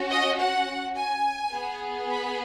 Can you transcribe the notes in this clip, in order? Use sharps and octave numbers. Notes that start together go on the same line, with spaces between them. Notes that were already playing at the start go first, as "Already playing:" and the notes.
Already playing: C#4 F#4
D#5
F#5
G#5
B3 G#4
B5